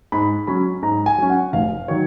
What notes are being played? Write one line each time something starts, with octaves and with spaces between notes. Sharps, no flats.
G#2 B5
F#3 C#4 B5
G#2 A#5
G#5
F#3 C#4
F#5
F1 F5
D#3 F#3 C#5